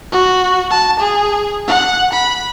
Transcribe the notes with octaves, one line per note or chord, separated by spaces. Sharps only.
F#4
A5
G#4
F#5
B5